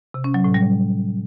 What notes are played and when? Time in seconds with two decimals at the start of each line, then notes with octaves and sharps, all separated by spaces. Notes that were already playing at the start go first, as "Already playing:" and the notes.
0.14 C3
0.24 C#4
0.34 F#3
0.44 A2
0.54 G3